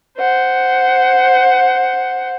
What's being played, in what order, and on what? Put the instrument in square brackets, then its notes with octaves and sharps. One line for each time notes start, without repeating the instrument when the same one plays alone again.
[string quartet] C5 F#5